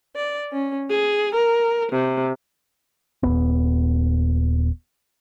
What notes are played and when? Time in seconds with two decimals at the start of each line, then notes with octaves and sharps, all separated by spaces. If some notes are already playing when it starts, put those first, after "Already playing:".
0.16 D5
0.52 C#4
0.90 G#4
1.35 A#4
1.92 C3
3.23 D#1 G#1 B3